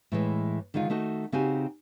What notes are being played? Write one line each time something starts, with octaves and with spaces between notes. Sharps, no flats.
A2 E3 G#3
D3 D#3 G#3 D#4 F4
D#3 A3 D#4 F#4
C#3 C4 D#4 F#4 G4 G#5